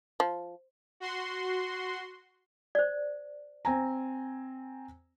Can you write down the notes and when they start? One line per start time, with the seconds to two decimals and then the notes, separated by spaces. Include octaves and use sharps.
0.20 F3
1.00 F#4 C6
2.75 C5 D5
3.65 C4 G#5 A#5